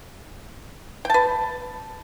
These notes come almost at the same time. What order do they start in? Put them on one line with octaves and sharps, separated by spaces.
G5 A5 B4